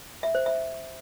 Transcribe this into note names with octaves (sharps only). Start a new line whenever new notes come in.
E5
C5
E5